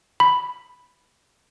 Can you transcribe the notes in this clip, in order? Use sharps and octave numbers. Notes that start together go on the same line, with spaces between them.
B5